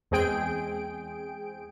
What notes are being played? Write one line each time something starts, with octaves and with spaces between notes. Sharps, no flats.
E2 G#3 C4 G#4 G5 D7